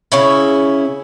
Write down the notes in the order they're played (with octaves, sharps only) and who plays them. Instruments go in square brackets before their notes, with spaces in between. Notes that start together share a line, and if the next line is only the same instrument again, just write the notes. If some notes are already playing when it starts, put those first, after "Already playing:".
[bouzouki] C#3 C#4 E4